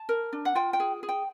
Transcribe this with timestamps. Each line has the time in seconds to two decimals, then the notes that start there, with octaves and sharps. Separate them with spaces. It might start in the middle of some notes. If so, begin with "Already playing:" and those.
Already playing: A5
0.09 A#4
0.33 D4
0.45 F#5
0.55 F4 G5
0.73 G5
0.80 G#4
1.03 G#4
1.09 G5